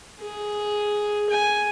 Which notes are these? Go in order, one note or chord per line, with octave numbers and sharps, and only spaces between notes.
G#4
G#5